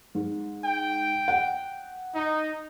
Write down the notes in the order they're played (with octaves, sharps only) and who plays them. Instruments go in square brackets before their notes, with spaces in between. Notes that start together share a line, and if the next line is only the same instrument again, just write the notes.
[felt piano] G#2
[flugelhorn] G5
[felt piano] F#5
[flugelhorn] D#4